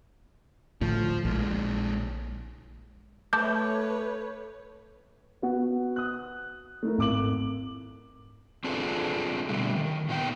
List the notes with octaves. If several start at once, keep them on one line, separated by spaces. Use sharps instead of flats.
D2 A2 F3 A3
A#1 A#2 G#3
A3 B4 C#5 A5 D6 G6
B3 F#4 F#5
D#6 F#6
A3 E4 A#4
G#1 D6 F#7
C4 D4 F4 G#4 A4 B4
B2 D3 G3 A3
D#3
A#2 D#3 B3 C5 G5